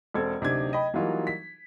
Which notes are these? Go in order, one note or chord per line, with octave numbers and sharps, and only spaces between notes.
E1 C4 A4 G#6
D1 C3 D4 D#4 G#6
D#5 G5 B5
E3 F#3 G3 A#3 D#4 F4
B6